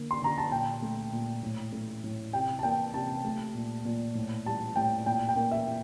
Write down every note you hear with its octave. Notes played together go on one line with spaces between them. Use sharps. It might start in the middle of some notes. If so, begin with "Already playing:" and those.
Already playing: D3 A#3
C6
D3 A#5
A5
A#2 G5
A3
A#2
A2
A3
A2
C3 G5
A5
A#3 G5
C3 A5
A3
A#2
A#2
A2
G3 A5
A2 G5
A#2 G5
G5
A#3
E5
A#2